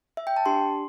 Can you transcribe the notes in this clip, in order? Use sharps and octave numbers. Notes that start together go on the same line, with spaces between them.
E5
G5
A5
D4 G4 C6